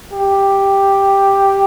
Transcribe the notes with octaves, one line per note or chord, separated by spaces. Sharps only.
G4